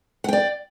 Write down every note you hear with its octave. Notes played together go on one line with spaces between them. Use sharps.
D5 F#5 G5